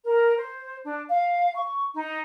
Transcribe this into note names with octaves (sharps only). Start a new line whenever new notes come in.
A#4
C5
D4
F5
C#6
D#4